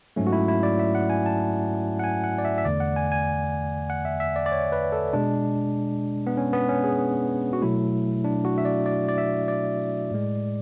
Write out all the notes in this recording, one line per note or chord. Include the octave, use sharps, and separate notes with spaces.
G#2 F#3 A3 C#4
F#4
E4
E4
D5
E5
F#5
G#5
A5
F#5
G#5
F#5
D5
E5
E5
E2 D3 A3 D5
F#5
G#5
G#5
F#5
E5
E5
D5
D5
C#5
B4
A4
B2 G#3 D4
B3
C#4
B3
C#4
G#4
F#4
B2 F#3 A3 E4
D4
F#4
E5
D5
D5
D5
E5
D5
A2 G#3